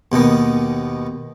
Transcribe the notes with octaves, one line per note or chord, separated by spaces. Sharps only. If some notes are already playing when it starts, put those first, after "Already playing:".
D#2 B2 D#3 B3